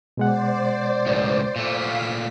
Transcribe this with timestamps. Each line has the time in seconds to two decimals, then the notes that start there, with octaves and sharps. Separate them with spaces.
0.17 B2 G#3 C5 D5 F#5
1.06 C#2 A2
1.56 A#2 A3 F5 B6